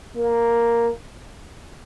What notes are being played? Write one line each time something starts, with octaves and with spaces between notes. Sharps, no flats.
A#3